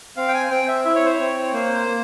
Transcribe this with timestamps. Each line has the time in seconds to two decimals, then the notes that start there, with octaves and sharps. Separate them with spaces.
0.17 C4 F5
0.28 G5
0.34 G#5
0.50 C4 G5
0.68 E5
0.85 E4 E5
0.95 C#5
1.05 C5
1.15 C4 C#5
1.53 A#3 C5
1.88 A#3